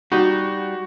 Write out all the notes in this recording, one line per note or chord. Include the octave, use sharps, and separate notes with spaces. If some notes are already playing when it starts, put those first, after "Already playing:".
G3 D#4 F#4 G4